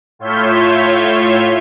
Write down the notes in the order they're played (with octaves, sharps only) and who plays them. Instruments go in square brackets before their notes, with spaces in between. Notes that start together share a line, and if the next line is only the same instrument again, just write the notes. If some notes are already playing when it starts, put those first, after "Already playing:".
[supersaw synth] A2 F4 C#5 E5 G6 B6